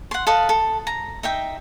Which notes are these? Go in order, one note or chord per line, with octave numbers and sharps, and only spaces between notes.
F#5 C6
A4 B4 D#5 F5
A4
A#5
D#4 E5 G5